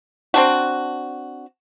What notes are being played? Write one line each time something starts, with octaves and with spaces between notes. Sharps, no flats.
C4 D4 F#4